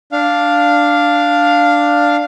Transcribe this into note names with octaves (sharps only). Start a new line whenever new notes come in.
D4 F5